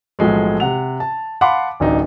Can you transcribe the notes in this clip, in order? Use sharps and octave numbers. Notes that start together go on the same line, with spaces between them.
B1 A2 F3 G#3 A3
C3 F#5 F7
A5
F5 F#5 A5 B5 C6 D6
D1 A1 D4 D#4